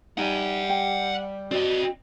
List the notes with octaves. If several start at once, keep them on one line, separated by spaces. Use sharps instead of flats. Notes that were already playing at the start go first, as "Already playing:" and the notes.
G3 D#4 F#5 G#5
G5
C4 F#4 D5 D#5